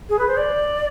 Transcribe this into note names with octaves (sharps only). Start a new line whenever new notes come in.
G#4
B4
C5
D5